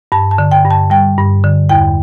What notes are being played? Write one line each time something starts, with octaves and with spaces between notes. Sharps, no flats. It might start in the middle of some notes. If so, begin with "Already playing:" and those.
G2 A5
A5
D3
G5
G2
A5
G3 G5
G2
D3
E2 G5